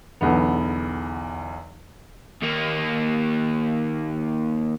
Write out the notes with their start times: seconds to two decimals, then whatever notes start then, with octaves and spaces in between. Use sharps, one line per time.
0.21 B1 E2 D3 B3
2.42 D#2 A#3